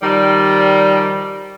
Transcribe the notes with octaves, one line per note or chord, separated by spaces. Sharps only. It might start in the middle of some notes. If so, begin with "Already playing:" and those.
D#3 F3 G3